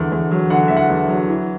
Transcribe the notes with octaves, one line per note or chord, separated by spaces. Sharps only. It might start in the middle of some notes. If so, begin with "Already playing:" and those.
Already playing: E2 D3
E2
F#3
D3 F#5
E2 E5
F#5
E2
F#3
E3